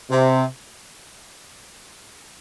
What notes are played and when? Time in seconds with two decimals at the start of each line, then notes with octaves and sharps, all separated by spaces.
0.10 C3